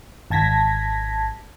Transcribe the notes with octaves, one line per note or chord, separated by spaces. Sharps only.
G#1 A5 G#6 A#6 B6